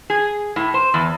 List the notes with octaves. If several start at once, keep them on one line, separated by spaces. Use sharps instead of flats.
G#4
A2
C5
E2